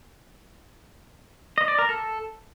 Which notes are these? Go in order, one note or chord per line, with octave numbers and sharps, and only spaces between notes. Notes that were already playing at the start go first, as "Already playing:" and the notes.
D#5
D5
A#4
A4